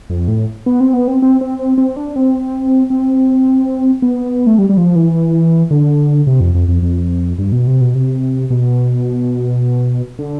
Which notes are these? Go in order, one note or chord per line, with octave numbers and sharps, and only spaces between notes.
F2
A2
B3
C4
B3
C4
C4
C4
C4
C4
D4
C4
C4
B3
A3
G3
G3
F3
E3
D3
C3
F2
F2
F2
F2
G2
B2
C3
B2
C3
B2
D3